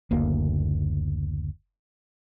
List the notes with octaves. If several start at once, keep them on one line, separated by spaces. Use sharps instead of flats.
F#1 D2 A#3